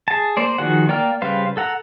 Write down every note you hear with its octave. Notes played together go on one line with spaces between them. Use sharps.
G#4 A5
A#3 C5 D5
D#3 F3 F#4 G#4 F#5
A#3 D5 G5 A#5 F6
C#3 G3 B4 C5 F5
A4 F#5 A#5